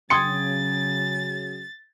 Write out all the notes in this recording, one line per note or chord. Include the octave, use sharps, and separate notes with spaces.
C#3 F#3 G5 C6 D#6 G#6 A6 C#7